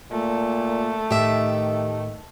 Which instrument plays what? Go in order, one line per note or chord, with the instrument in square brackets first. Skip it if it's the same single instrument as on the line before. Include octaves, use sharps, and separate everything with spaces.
[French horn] A#2 [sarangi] A3
[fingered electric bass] A2 [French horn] D#3 [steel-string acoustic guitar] G4 E5